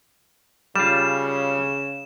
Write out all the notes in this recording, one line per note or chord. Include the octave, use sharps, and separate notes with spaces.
C#3 G3 F4 E7